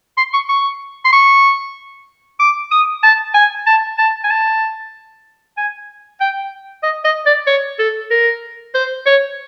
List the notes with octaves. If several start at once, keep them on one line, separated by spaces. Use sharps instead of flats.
C6
C#6
C#6
C6
C#6
D6
D#6
A5
G#5
A5
A5
G#5
A5
G#5
G5
D#5
D#5
D5
C#5
A4
A#4
C5
C#5